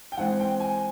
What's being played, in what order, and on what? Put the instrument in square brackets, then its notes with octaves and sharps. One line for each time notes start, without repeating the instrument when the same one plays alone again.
[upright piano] G5
E3 G#3 C4 F#5
G5
G#5